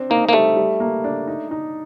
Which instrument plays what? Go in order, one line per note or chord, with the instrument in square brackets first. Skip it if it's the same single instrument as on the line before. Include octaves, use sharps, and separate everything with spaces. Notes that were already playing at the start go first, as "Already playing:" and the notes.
Already playing: [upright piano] C4 D4
[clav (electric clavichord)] A#3 [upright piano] D#4
[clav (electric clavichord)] A#3
[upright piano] G3 [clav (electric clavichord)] A3
[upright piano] G3
A#3
D4
D#4
D#4